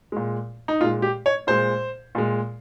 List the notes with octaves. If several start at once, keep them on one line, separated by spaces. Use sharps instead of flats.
A#2 G#3
D#4
A#2 G#3 F4
G4
C#5
A#2 G#3 C5
A#2 G#3